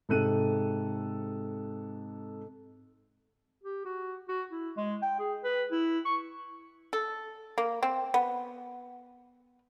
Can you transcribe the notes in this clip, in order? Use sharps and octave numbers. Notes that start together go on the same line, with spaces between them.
G#2 C3 A4 F#6 D#7
G4
F#4
F#4
E4
G#3
G5
G#4
B4
E4
C#6
A4
A#3
C4
B3